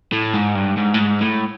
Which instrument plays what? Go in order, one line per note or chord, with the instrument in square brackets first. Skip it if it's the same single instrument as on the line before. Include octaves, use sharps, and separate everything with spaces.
[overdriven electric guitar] A2
G#2
G2
G#2
A2
G#2
A2